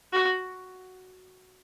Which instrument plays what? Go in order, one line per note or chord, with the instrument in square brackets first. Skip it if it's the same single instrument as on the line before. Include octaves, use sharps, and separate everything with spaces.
[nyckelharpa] F#4